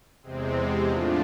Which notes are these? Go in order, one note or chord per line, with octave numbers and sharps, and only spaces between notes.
E2 C3 G#3 C4
A2 F3 A3 D4 F4